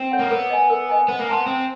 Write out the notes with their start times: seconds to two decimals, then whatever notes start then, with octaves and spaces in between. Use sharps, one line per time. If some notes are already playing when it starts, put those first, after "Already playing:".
Already playing: C4
0.12 C#5 F#5
0.19 A#3
0.31 B3 A#4
0.50 D#5 G#5
0.70 A#4
0.89 D#5 G#5
1.08 B3 C5
1.20 A#3
1.28 B3 F5 A5 C6
1.46 C4 C5